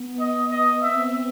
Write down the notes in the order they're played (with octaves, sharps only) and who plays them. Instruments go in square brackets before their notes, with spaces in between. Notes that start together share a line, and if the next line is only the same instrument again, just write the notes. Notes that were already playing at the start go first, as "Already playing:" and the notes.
Already playing: [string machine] B3
[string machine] B3 [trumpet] D#5
[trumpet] D#5
[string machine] C4 [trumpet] E5